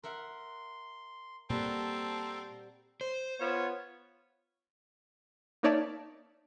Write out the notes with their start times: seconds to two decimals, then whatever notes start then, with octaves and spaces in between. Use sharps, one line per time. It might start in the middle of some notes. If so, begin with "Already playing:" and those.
0.04 A#4 E5 F#5 C6
1.50 A#2 G3 A#3 C4 F#4 A4 A5 A#5
3.01 C5
3.40 B3 F4 C#5
5.63 A#3 D#4 C#5 D5 E5 A5